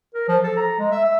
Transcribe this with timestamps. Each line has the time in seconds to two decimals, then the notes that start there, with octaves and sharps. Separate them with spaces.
0.14 A#4
0.28 F3
0.44 A4
0.57 A#5
0.79 G#3
0.92 E5
1.05 E5